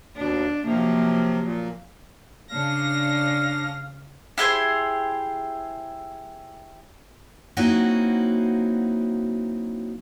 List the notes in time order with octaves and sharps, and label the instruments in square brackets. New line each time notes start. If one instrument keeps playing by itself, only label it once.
[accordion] D#2 B2 [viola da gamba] D4
[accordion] C3 [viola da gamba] F3 F#3 A#3
[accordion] A#2
[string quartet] C#3 A#6 [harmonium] D4 [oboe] F5
[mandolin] E4 G4 G#4 C5
[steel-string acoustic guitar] F#3 A#3 C4 D#4 E4 F#4